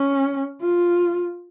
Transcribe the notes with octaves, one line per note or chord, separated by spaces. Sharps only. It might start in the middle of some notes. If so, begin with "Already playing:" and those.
Already playing: C#4
F4